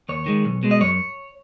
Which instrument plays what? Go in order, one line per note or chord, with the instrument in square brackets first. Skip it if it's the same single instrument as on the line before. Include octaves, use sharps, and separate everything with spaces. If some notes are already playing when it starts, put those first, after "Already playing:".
[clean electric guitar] D#2 C#5
D#3 G#3
B1
B2 G#3
D#5
F#2 C#5